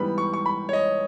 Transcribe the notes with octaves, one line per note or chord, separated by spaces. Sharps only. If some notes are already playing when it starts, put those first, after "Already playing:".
Already playing: G#2 E3 G3 B3 B5
C#6
C#6
B5
C#5
D#5